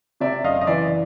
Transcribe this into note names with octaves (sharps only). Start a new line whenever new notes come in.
C3 D5 E5
F#1 D#5 F5
D#5
E3 D5 E5